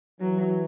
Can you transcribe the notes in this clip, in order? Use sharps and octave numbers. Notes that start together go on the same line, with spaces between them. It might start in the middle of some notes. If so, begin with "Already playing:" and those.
E3 F#3